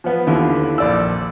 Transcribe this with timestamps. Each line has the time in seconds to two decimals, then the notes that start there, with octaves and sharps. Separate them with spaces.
0.04 F3 B3
0.27 D#2 D3 E4 F4
0.78 A#1 D5 E6